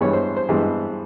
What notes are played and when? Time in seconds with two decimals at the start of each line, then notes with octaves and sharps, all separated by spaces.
0.01 G2 E3 G#3 B3 C#5
0.13 C5
0.37 C5
0.49 G2 E3 G#3 B3